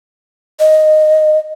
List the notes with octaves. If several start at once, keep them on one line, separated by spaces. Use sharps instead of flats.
D#5